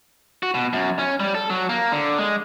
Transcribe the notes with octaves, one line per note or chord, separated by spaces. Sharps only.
F#4
B2
F#2
C#4
G3
A4
F#3
A#3
D3
G#3